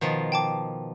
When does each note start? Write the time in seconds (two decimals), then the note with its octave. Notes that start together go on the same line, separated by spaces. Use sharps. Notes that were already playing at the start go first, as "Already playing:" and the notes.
0.01 B2 D#3 F3
0.32 G5 A5 D6